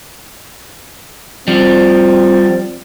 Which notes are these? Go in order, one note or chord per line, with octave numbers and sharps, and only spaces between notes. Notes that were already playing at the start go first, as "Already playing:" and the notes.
F3 G3 C4